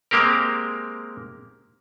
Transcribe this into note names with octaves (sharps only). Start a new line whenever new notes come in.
G#3 A#3 C4 G4 A#4